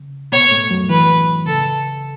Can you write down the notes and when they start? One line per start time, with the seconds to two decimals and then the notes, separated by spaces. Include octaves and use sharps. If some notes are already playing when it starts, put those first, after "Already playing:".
Already playing: C#3
0.32 B2 B3 C#5
0.51 A2 A3
0.71 F#2 F#3
0.89 E3 B4
1.46 C#3 A4